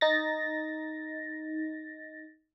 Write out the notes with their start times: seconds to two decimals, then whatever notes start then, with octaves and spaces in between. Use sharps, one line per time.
0.01 D#4 A6 A#6